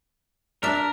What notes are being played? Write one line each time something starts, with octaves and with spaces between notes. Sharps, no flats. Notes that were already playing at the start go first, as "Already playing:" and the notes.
D4 A#4 E5